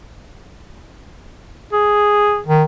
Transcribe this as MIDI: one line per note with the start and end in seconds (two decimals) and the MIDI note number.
1.73 2.39 68
2.47 2.64 51